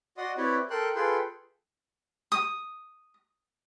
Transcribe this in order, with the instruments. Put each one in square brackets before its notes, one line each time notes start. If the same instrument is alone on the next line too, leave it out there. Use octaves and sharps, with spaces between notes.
[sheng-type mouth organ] F#4 D5 D#5 F#5 C6 D#6
C4 E4 G4 B4 C#5 D5
A4 A#4 G5 C6 F#6
F4 G#4 A4 B4 G5 C6
[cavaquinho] D#6